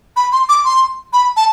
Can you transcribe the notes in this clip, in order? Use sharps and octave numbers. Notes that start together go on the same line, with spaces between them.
B5
C6
D6
C6
B5
A5